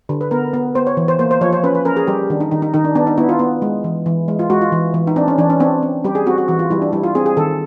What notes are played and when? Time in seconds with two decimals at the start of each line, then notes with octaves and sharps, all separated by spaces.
0.09 D3
0.21 B4
0.31 B3 A#4
0.54 B3
0.75 B3 C5
0.87 C#5
0.97 E3
1.08 C5
1.19 A#3 C5
1.31 C5
1.41 F3 C#5
1.53 C5
1.64 C#4 B4
1.75 B4
1.85 C#4 A#4
1.97 G#4
2.07 G3 G4
2.30 D#3 D4
2.40 D#4
2.51 D#3 D#4
2.62 D#4
2.74 D#3 D#4
2.84 D4
2.95 B3 D4
3.07 D#4
3.18 B3 E4
3.29 F4
3.39 B3
3.62 G#3
3.84 E3
4.06 E3
4.28 G#3
4.39 F4
4.50 G#3 F#4
4.61 F4
4.72 E3
4.94 E3
5.07 D#4
5.16 C4 D4
5.28 C#4
5.38 E3 D4
5.50 C#4
5.60 C4 D4
5.83 C4
6.04 G3 G4
6.15 G#4
6.26 C4 F#4
6.38 F#4
6.48 E3 F#4
6.59 F4
6.70 G3 E4
6.82 D4
6.93 G3 E4
7.04 F4
7.15 C4 G#4
7.26 G#4
7.37 D#3 A4